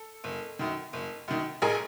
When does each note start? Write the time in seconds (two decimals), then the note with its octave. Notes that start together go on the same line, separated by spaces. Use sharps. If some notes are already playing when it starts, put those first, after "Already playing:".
Already playing: A4
0.24 F#1
0.59 F#2 D#3
0.93 F#1
1.28 F#2 D#3
1.62 A1 G#4 A#4